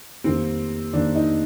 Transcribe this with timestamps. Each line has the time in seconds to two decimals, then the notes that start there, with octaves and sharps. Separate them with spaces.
0.24 F2 D#3 G3 A#3 C4
0.93 F2 D#3 G3 A#3 D4
1.15 D#4